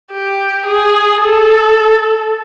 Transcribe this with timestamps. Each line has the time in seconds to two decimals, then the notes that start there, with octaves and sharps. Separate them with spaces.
0.12 G4
0.66 G#4
1.22 A4